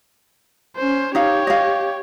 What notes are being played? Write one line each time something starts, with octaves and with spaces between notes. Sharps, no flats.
C#4 C5
D#4 G4 C#5 F5
D#5 F5